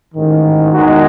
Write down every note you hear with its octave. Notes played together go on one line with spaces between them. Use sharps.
A1 G#2 D#3
E2 D#3 G#3 D#4 F#4